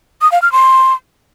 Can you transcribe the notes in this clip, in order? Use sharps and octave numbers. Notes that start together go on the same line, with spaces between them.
D#6
F5
F6
C6